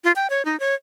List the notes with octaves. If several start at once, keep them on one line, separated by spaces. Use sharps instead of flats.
F4
G5
C#5
D#4
C#5